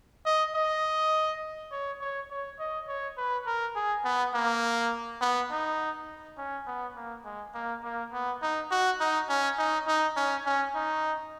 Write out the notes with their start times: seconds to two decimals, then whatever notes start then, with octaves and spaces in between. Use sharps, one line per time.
0.25 D#5
0.55 D#5
1.72 C#5
2.00 C#5
2.30 C#5
2.59 D#5
2.88 C#5
3.17 B4
3.46 A#4
3.75 G#4
4.04 B3
4.34 A#3
5.21 B3
5.51 D#4
6.38 C#4
6.67 B3
6.96 A#3
7.25 G#3
7.54 A#3
7.84 A#3
8.12 B3
8.42 D#4
8.71 F#4
9.00 D#4
9.29 C#4
9.58 D#4
9.87 D#4
10.16 C#4
10.46 C#4
10.75 D#4